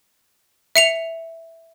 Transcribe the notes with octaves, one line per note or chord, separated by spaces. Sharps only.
E5 C#7 F7